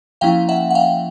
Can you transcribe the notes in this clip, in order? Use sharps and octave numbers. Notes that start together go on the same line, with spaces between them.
F3 A#3 C#4 E4 F5 G5
E5 F#5
F#5
F5 G5